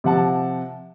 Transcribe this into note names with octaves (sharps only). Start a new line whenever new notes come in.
C3 F3 F#5 A5